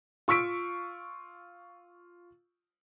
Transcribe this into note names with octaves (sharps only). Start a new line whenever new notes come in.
F4 C#6 E6 B6 D7